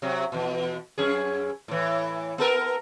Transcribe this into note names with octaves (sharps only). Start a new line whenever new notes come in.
C3 F#3
E2 B2
F#2 C#4 G#4
A2 E3
B3 A4 A#4